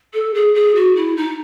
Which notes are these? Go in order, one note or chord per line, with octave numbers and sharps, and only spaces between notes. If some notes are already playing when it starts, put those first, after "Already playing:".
A4
G#4
G#4
F#4
E4
D#4